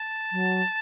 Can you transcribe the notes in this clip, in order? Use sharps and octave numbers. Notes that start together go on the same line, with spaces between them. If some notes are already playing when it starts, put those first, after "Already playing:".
Already playing: A5
F#3